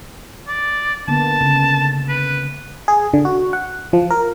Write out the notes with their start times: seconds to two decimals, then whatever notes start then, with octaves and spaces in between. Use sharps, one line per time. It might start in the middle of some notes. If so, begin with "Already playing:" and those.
0.48 D5
1.08 D3 A#3 B3 A5
1.41 C#3
2.09 B4
2.88 G#4
3.13 D3
3.25 F#4
3.53 F#5
3.93 F3
4.11 A#4